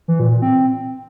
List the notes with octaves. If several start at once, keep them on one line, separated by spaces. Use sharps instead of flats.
E3
A#2
A#2
C4